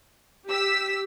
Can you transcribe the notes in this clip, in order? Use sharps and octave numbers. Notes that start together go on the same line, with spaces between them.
G4 E6 B6